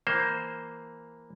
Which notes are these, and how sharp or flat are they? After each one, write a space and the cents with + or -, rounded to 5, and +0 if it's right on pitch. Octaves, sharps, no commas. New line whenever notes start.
E3 +0 A#3 +0 C5 +0